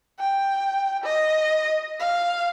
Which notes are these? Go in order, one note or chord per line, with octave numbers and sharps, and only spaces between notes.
G5
D#5
F5